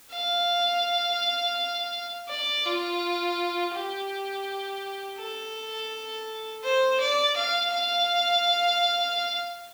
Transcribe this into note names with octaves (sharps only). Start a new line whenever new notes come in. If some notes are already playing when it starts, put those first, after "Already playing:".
F5
D5
F4
G4
A4
C5
D5
F5
F5